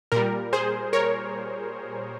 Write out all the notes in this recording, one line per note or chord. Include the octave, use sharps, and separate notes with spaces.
A#2 G3 A#4
G#4 C5
A#4 C#5